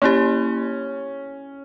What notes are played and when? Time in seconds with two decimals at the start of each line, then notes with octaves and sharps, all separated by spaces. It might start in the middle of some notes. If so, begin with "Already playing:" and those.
0.02 A#3 C#4 E4 G4